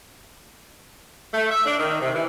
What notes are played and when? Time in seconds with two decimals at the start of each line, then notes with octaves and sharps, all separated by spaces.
1.32 A3
1.50 E5
1.64 D4
1.78 D#3
2.00 C3
2.15 E3